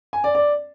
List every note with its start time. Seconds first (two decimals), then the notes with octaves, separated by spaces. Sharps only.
0.13 G#5
0.24 D5
0.35 D5